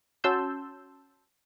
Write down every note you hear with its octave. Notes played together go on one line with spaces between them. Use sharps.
C#4 F#4 A5 C6 E6 G6